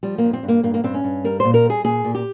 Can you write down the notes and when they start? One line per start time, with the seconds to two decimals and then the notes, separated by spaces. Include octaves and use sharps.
0.03 F3 G3
0.18 A#3
0.24 G2
0.33 C4
0.43 G2
0.48 A#3
0.63 G2 A#3
0.74 A#3
0.84 G2 C4
0.94 C#4
1.04 G2
1.24 G3 A#4
1.40 A#2 C5
1.54 A#4
1.65 G3 G#4
1.84 A#2 G#4
2.04 A#2
2.15 G4